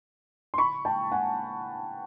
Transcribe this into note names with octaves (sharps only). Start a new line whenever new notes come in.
C6
B5 C#6
G5 A5
F#5 G#5